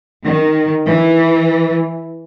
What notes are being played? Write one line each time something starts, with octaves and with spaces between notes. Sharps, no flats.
D#3
E3